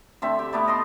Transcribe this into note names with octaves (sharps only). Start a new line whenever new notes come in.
D3 A3 C4 E5
G4
A3 B3 E4 D5
D#5 A5 C6